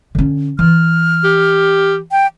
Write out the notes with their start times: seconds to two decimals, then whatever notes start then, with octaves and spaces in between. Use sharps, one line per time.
0.15 D3 C#4
0.59 E3 F6
1.24 G4
2.12 G5